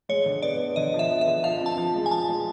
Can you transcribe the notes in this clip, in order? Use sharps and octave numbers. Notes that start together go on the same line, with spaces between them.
G#3 C#5
D3
B3 D5
B3
D3 D#5
F3
E5
B3
E5
D3
F3 F5
C4
A5
F3
G#3
G#5
F3 A5
G#3